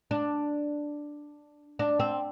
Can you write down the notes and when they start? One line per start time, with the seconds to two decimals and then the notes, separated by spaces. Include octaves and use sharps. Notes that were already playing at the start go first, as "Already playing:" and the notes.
0.11 D4
1.79 D4
2.00 C4